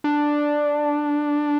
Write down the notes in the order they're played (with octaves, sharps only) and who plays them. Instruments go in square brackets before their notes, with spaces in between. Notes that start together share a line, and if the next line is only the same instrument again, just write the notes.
[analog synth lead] D4